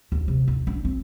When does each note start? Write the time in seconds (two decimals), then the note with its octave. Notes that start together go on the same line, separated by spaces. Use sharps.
0.12 D#2
0.28 C3
0.48 D#2
0.67 D4
0.85 C4